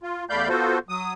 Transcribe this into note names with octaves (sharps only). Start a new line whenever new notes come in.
F4
E2 A3 D5 F5 B5 G6
B3 F4 F#4 A4 C5
F#3 D#6